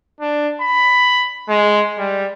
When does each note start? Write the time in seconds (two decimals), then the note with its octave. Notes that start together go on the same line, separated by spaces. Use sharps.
0.21 D4
0.61 B5
1.48 G#3
1.98 G3